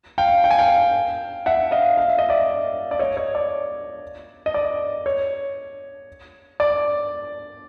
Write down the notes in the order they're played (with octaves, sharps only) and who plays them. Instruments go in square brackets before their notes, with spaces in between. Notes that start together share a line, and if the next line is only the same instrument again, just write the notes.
[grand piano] F5 G5
G5
G#5
F5 G5
E5 F#5
D#5 F5
F5
E5
D#5
D5 E5
D5
C#5 D#5
C#5
D5
D#5
D5
C#5
D5